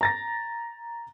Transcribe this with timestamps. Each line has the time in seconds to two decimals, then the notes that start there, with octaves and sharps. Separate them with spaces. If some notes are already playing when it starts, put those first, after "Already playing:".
0.01 A#5 A6 A#6